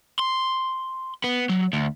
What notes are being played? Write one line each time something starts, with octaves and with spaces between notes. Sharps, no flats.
C6
B3
F#3
D2